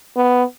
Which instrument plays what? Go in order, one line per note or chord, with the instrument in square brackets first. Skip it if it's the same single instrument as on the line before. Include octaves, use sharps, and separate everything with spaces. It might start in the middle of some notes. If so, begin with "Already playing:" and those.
[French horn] B3